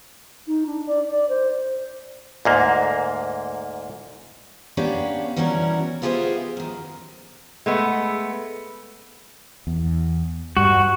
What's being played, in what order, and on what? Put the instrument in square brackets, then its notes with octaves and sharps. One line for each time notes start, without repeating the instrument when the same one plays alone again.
[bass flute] D#4
D4
D5
D5
C5
[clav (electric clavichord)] D2 G#2 A#3
[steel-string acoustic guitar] A#3 B3 C#4 D4 G4
B2 E3 G3 C#4 F#4 A#4
B3 F4 G4 G#4 C5 E5
F#2 D#3
[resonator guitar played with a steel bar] G#3 A3 B3
[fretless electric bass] E2
[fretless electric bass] G2 G3 [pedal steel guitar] F#4